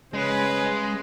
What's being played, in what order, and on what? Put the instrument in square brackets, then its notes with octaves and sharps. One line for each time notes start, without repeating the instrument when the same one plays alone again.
[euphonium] C#3 [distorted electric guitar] G#3 [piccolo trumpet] B4